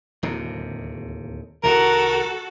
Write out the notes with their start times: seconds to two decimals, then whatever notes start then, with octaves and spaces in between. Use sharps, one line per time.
0.23 D1 D#2 C3
1.63 C2 D#3 F#4 A4 A#4